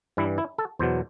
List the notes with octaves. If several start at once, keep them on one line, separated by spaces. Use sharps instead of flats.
G2 E3 G3 E4
E4
A4
E2 B2 F#3 C5